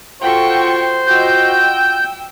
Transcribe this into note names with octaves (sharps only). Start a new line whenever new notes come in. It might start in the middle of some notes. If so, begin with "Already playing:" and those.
F4 F#4 A4 C5 G5 C#6
F4 F#4 D#5 G5 E6 G6